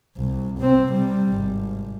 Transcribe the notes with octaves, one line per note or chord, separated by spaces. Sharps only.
C2
C3 C4
C3 G3
G#1